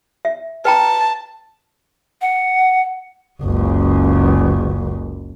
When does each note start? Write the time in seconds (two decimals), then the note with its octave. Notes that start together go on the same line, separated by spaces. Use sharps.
0.25 E5
0.65 B4 G5 A5 A#5
2.21 F#5
3.42 F#1 C#2